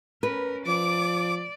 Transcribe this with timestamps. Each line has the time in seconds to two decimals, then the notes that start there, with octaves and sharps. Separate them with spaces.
0.23 C#4 A#4 B4
0.66 F3 D5 D6